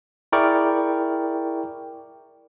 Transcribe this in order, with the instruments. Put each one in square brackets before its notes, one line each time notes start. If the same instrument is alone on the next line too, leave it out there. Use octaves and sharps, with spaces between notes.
[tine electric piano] E4 G#4 A#4 D5 G5 C#6